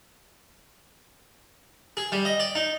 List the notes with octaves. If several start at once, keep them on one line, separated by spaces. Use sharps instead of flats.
G#4
G3
D#5
D5
D#4